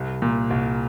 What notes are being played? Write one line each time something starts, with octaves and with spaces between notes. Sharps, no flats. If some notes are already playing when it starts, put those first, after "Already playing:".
Already playing: C2
A#2
C2